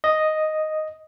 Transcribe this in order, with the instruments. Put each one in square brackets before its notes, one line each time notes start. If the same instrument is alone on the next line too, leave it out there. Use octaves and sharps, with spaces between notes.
[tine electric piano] D#5